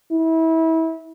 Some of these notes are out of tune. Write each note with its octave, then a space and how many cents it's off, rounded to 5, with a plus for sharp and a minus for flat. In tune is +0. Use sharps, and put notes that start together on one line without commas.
E4 -30